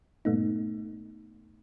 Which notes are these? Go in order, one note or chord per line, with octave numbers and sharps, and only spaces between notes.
G2 A#2 A3 B3 D#4